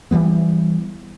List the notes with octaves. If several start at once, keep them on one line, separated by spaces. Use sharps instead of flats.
E3 F#3 G3 B3